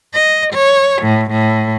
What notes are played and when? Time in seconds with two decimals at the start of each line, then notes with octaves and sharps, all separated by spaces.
0.14 D#5
0.53 C#5
1.02 A2
1.31 A2